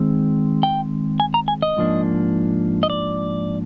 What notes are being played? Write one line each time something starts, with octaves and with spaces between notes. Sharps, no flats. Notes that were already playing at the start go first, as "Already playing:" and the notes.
Already playing: D#3 G#3 C4
G5
G#5
A#5
G#5
D#5
G#2 F3 A#3 D4
D#5
D5